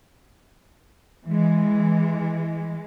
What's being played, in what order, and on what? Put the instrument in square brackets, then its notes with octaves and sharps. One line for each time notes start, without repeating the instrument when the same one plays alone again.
[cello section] E3 G#3